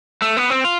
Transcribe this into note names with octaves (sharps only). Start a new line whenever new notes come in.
A3
B3
C4
F4